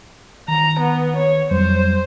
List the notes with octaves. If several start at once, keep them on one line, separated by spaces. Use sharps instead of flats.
D#3 A#5
B3
C#5
F2 F#3 G3 C5